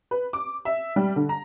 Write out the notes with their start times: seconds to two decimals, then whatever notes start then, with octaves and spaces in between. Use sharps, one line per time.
0.11 B4
0.33 D6
0.65 E5
0.96 G3
1.16 D3
1.29 A#5